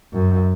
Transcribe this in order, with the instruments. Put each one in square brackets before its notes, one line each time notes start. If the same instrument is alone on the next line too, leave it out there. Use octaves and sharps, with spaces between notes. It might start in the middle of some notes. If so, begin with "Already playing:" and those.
[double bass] F#2